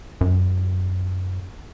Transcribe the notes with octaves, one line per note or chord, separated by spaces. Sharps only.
F#2